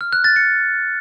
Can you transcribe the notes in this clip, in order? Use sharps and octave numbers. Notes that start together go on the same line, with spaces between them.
F6
F#6
A6
C#7